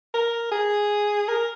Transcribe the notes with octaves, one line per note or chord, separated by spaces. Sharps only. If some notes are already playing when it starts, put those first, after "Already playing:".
A#4
G#4
A#4